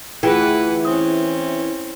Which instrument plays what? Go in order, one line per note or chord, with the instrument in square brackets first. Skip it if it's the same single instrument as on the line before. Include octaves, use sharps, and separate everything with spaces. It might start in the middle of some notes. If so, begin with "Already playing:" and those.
[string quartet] D2 B4 F#5 [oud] E3 [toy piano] F4 G#4 G5
[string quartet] C4 C#4 [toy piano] D#6